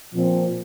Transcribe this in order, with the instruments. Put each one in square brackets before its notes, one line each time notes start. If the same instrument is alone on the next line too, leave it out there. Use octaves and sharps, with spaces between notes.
[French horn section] A#2 F3 C4